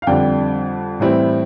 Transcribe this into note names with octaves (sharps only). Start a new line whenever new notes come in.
F5
F2 D3 G3 D4 G5
A2 E3 G3 C4 E4